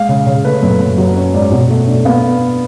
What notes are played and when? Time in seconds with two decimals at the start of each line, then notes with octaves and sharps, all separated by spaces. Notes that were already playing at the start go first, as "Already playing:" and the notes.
Already playing: G#3 F5
0.09 C#3
0.26 C#3
0.45 A3 B4
0.63 F#2
0.80 F#2
0.98 F#3 C#5
1.15 C#4 C#5
1.34 G#2 D5
1.52 B2
1.70 A3
1.88 D4
2.05 B3 F5